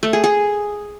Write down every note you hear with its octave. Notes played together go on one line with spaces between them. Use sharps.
A3
G#4
G#4